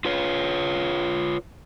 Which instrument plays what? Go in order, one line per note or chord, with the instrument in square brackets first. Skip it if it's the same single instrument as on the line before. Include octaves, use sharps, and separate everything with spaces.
[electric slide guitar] F4 B4 C#5